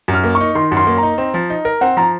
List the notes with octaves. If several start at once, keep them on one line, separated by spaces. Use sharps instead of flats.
F#2
F6
A#3
C#6
D#4
D#3 C6
F#2
C6
A#3
A#5
D#4
C4
F3
D#4
A#4
C4 F#5
F3 A#5